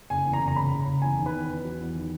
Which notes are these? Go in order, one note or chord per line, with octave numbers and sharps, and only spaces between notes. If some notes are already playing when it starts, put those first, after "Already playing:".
F#1 G#5
E2
A#5
F#1
A#5
C#3 B5
C#3
F#1
E2 G#5
D#3
B4
E2
E2
F#3
E2
D#3